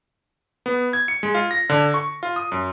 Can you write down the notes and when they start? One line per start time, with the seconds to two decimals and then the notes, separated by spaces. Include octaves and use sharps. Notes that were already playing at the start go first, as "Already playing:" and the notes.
0.66 B3
0.93 G#6
1.08 C#7
1.23 G#3
1.35 F4
1.51 A#6
1.70 D3
1.94 C#6
2.23 F4
2.36 D#6
2.52 F#2